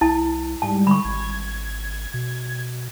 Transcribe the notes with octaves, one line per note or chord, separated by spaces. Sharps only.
C2 E4 A5
G#2 G3 A5
D3 B5 C#6
G#1 G#6
B2